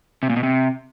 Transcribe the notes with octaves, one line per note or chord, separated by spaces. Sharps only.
C3
A#2
B2
C3